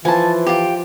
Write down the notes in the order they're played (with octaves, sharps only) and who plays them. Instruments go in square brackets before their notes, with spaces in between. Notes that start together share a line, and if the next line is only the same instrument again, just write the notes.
[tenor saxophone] E3 [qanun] F3 [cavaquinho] G#5 A5
[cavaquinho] F4 G4